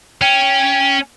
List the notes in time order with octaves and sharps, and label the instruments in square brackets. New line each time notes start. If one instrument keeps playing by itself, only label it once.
[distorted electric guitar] C#4 [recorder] G5